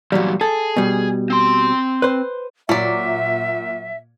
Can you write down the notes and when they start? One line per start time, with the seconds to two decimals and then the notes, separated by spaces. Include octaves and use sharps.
0.12 E2 A#2 F#3 G3
0.41 G#4 A4
0.77 B2 G3
1.30 C4 C6
2.02 B4 C5
2.69 A#2 F#3 D5 E5